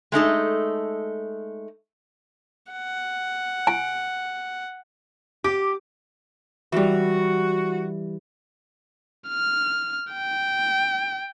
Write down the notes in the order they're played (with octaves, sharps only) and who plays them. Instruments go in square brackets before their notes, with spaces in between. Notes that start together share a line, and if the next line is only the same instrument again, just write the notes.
[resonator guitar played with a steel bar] G#3 A3 D#4 A4
[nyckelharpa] F#5
[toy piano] G#5
[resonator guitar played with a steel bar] G4 [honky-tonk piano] D6
[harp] E3 G3 [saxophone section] F#4
[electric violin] F6
G5